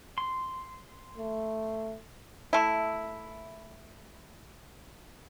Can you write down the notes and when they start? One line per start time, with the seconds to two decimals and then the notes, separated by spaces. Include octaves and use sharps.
0.18 C6
1.18 A3
2.53 A3 E4